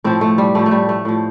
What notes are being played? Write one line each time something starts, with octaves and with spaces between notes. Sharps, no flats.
A2 F3 C4
A3
G3
A2 F3 A3
A3
G3
A3
A2 F3